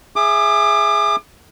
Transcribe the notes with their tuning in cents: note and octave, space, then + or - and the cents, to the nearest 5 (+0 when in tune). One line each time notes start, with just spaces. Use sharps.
G#4 +0 E5 +5 D6 +35